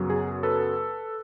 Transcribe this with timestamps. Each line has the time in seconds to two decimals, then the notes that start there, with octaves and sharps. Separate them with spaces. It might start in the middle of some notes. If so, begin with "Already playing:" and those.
Already playing: F#2 C#3 F#3 B3
0.10 G#4
0.43 A4 B4